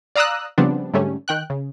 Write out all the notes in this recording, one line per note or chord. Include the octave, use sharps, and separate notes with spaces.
D5 F5 A#5 D#6 E6 F#6
C#3 F3 G3 B3 C4 D4
G#2 D3 G3 A3 C#4
D#3 G5 F#6
C#3